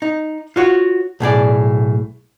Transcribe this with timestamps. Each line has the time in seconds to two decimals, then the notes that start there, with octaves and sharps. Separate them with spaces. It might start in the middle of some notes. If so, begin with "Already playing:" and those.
0.02 D#4
0.56 F4 F#4 C#5
1.20 B1 A2 G#4 D5